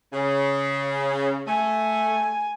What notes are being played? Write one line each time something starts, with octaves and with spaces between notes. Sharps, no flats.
C#3
A3 G#5